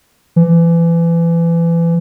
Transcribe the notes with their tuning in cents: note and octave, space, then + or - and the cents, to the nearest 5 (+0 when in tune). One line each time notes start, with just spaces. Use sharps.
E3 +30